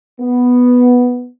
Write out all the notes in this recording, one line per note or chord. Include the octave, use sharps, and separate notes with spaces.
B3